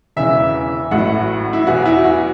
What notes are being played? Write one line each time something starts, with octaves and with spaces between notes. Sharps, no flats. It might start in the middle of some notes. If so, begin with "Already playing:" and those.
E1 E2 C#3 E3 E5
A1 A2 F#3 F#5
E4
E2 B2 F#3 F#4
E4
F#4